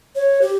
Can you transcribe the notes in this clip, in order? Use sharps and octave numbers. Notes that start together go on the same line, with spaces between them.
C#5
G4